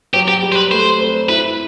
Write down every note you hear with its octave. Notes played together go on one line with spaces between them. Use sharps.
F#3 G4
G4
G3
C5
B4
A3 C5
C4
E4 B4